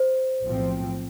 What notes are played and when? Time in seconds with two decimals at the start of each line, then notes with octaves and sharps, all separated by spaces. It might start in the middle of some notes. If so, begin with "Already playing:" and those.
Already playing: C5
0.44 B1 A2 F3 C4